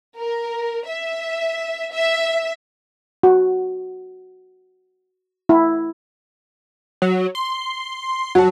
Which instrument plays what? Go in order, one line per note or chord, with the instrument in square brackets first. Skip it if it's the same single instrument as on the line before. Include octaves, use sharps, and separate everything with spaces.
[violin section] A#4
E5
E5
[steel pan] F#4
E4
[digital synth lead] F#3
C6
[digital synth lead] F#3 [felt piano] F#4 A5